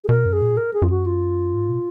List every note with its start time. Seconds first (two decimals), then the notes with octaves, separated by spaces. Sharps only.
0.04 G#4
0.09 B2 A#4
0.26 F#2
0.33 G#4
0.42 A#2
0.57 A#4
0.74 G#4
0.82 F#2 F4
0.90 F#4
1.06 F4
1.54 G#2
1.69 B2